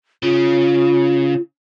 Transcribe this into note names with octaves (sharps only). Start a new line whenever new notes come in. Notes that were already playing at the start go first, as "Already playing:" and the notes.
C#3 F4